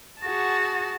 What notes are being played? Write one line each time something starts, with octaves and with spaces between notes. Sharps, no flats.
F#4 G#4 F#5 A5